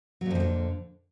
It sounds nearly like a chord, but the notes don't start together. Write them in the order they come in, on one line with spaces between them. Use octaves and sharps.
F#3 A#2 F2 F3 D3